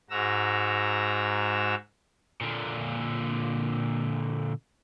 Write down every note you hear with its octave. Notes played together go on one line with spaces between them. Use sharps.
G#2 F#4 A#5 E6
A#2 D3